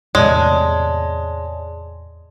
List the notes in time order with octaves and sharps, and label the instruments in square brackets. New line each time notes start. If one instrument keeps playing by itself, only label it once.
[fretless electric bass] E2 A2 C3 [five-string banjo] G#3 [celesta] C#5 D5 A5